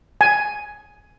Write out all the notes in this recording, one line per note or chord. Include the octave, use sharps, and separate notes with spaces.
G#5